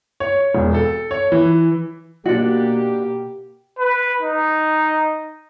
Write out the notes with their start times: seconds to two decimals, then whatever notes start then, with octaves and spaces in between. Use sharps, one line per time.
0.20 C#5
0.55 E1
0.74 A4
1.11 C#5
1.32 E3
2.26 B2 A#3 D4 F#4 G4
3.79 B4
4.22 D#4